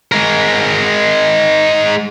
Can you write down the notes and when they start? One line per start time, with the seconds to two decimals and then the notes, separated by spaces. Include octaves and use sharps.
0.12 G#3 A#4